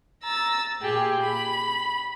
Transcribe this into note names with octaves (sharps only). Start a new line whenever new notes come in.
A#5 E6 A6
A#2 G4 G#4
B5